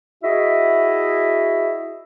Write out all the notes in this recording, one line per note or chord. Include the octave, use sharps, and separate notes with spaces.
E4 F#4 G#4 D#5 E5